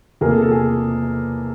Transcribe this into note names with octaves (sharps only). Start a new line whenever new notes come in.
E2 C3 F3 A#3 G#4 A#4
A4
A4
G#4